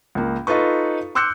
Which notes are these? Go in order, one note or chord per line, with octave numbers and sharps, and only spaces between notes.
C#2 A#3
D#4 F4 A4 B4 C#6
C6 D6 E6 F#6 G6 C#7